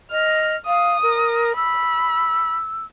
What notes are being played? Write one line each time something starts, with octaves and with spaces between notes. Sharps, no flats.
D#5 F6
F5 D#6
A#4
B5 E6